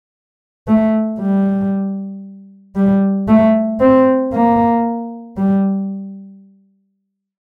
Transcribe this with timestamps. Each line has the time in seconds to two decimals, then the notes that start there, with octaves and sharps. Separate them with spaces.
0.68 A3
1.19 G3
2.76 G3
3.28 A3
3.80 C4
4.33 A#3
5.37 G3